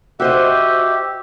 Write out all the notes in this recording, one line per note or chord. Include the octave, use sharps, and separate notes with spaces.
F#4 G4 C5 D#5 E5